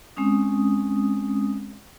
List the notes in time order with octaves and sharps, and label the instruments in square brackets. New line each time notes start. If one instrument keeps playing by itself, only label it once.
[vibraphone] G#3 C4 C#4 D#6